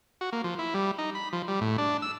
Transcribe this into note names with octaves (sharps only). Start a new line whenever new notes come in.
F#4
A#3
F3
E4
G3
D#4
B5
F3
G3
A2
D4
E6